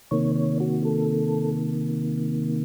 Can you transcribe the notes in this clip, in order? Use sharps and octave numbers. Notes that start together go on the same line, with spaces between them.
C3 D#3 A#3 C#5
C#5
F#4
A4